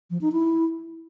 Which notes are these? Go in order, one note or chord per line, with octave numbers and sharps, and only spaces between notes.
F3
D#4
E4